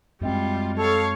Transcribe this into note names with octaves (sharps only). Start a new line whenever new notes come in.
F#2 G3 G#3 C4 F4
A4 C#5 F5